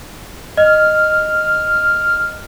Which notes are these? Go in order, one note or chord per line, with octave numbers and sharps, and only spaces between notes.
D#5 F6